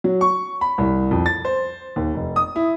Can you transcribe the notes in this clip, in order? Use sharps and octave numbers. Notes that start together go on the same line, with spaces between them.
F#3
C#6
B5
C2
F2
A6
C5
D#2
F1
D#6
E4